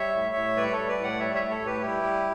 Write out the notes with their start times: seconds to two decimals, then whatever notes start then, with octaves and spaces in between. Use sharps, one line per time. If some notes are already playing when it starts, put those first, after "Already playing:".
Already playing: G3 C#5 E5
0.15 A2
0.35 A2
0.56 G3 B4 D5
0.72 A4 C#5
0.77 G3
0.88 B4 D5
0.99 A2 D5 F#5
1.19 G3 C#5 E5
1.34 C#5 E5
1.41 A2
1.50 A4 C#5
1.61 A2 G4 B4
1.82 G3 E4 G4
2.03 G3